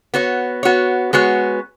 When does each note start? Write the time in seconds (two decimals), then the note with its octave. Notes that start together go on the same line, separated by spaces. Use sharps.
0.14 B3 F#4 C#5
0.63 B3 F#4 C#5
1.13 G#3 B3 F#4 C#5